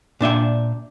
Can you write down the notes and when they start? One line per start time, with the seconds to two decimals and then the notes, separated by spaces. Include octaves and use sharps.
0.21 A#2 D4 E5 G5